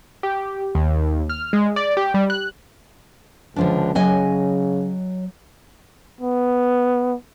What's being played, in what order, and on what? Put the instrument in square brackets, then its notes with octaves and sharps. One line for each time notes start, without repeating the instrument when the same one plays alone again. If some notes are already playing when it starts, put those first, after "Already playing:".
[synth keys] G4
D#2
F6
G#3
D5
G4
G3
F#6
[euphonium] C#2 [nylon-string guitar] D3 F3 D4
[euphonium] C#3 [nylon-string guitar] F#3 D#5 G#5
[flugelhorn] B3